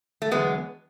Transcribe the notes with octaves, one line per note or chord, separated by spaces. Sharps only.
A3
E2 D3 F#3 G#3 B3